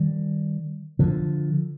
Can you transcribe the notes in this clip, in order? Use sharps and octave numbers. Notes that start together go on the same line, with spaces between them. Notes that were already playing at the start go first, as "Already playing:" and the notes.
Already playing: D#3 G3
D3 F3